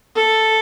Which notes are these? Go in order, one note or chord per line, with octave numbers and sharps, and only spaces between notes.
A4